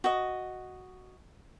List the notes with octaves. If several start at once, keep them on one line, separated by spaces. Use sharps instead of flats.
F#4 D#5